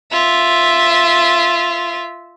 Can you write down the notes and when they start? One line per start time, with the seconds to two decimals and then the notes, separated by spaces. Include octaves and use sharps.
0.12 F4 E5